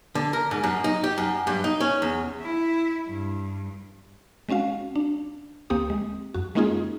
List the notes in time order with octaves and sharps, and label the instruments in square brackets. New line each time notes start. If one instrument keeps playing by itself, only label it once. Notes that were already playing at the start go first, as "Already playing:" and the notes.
[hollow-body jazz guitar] D3
A#4
G#2
F#2
D#4
G4
F#2
G2
D#4
C#4
E2
[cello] E4
G2
[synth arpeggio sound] G#3 C4 C#4 F#4 F5
D4
D2 A#3 C4 G4 D#6
G#3
F#2 F#4
G#3 A#3 C#4 D#4 F4 G#4